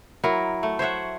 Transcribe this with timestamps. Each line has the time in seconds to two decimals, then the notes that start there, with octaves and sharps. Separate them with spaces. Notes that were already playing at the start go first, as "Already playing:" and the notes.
0.24 F#3 E4 A#4
0.63 A3
0.79 C5 C#5 E5 F#5